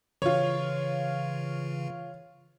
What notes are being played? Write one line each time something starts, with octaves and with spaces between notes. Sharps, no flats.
C#3 E3 F4 C#5